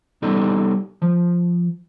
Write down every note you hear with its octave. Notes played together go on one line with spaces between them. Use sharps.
G3 B3 D#4 G4 A4
F3